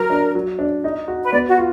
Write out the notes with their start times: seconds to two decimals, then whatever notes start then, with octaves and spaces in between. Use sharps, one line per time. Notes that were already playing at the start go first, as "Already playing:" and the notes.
Already playing: F#3 A#4
0.10 D4
0.35 F#3
0.59 D4
0.84 D#4
1.08 F#4
1.23 B4
1.33 B3 D5
1.49 F#4
1.58 F4